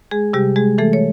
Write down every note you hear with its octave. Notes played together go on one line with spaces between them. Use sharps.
G#3 G#4
C3 G3 G4
G#3 G#4
E3 A3 A4
C#5